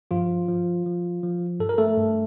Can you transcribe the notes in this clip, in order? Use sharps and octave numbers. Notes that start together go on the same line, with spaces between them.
G2 F3 F4
F3
F3
F3
G2 A4
A#4
A3 A4
G2